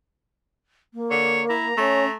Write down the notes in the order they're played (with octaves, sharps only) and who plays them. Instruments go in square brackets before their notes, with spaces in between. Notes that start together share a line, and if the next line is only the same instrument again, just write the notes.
[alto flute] A#3
[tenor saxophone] D3 [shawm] C#5
[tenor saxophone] E4 [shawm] A#5
[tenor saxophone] A3 [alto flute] C#4